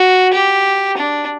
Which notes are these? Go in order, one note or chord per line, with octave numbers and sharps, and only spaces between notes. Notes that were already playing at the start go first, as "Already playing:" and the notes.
Already playing: F#4
G4
D4